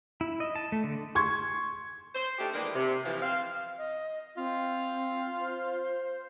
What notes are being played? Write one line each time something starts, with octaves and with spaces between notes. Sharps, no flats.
E4
D#5
A5
A3
D3
C6 C#6 G#6
C5
A3 D4 D#4 G4
D#3 E3 G#3 A#3 D4 B4
C3
E3 F3
C4 F5
D#5
C4 F4
C5